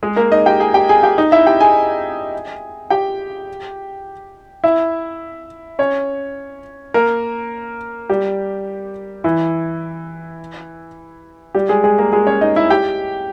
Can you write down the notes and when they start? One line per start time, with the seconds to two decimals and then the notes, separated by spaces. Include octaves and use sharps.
0.03 G#3 G#4
0.16 A#3 A#4
0.32 D#4 D#5
0.46 G4 G5
0.60 G#4 G#5
0.74 G4 G5
0.89 G#4 G#5
1.03 G4 G5
1.18 D#4 D#5
1.32 E4 E5
1.46 G4 G5
1.61 G#4 G#5
2.90 G4 G5
4.64 E4 E5
5.79 C#4 C#5
6.94 A#3 A#4
8.10 G3 G4
9.24 E3 E4
11.55 G3 G4
11.69 G#3 G#4
11.84 G#3 G#4
11.98 A#3 A#4
12.13 G#3 G#4
12.27 C#4 C#5
12.41 D#4 D#5
12.56 E4 E5
12.70 G4 G5